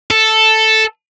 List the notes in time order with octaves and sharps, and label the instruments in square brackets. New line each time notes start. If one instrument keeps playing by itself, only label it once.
[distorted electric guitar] A4